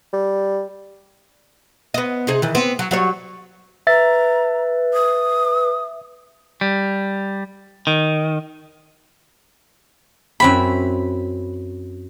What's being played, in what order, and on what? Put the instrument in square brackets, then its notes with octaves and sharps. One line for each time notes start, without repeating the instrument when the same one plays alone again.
[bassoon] G3
[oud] B3 D#5
C3 D#4 G#4
D#3 E3
B3 C4
F#3
F#3 G3 C#5
[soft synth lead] B4 [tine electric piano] E5 A6 [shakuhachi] A#5
[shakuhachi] D#6
[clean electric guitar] G3
D#3
[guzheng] F#2 C4 E4 [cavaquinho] B5